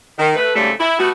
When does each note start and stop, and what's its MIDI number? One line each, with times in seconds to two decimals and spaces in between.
0.18 0.33 51
0.36 0.51 57
0.36 0.51 71
0.55 0.71 41
0.55 0.71 44
0.55 0.71 49
0.55 0.71 55
0.55 0.71 57
0.55 0.71 69
0.79 0.96 64
0.99 1.09 55
0.99 1.09 57
0.99 1.09 59
0.99 1.09 66